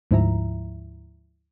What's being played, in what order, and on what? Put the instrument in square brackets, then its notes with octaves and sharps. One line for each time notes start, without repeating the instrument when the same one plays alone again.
[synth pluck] D2 G#2 F3 E4 E5 A#5